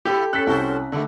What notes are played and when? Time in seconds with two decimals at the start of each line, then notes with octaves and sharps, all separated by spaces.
0.05 A#2 E4 G4 A4
0.33 A2 C#4 A4 F#6 B6
0.47 C2 F#4 A4 C5
0.92 G2 D3 D#3 G3 A3